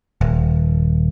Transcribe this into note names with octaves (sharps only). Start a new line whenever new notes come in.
D#1